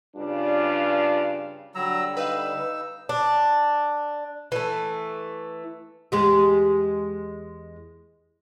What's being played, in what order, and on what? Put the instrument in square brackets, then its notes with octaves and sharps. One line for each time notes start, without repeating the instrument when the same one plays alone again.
[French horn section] G2 C#3 G3 D4 F4 D5
[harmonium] D3 G3 [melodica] F#3 A#5 E6
[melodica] D#4 E6 [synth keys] B4 F5
[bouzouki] D4
E3 A3
[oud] E2 G#3 G4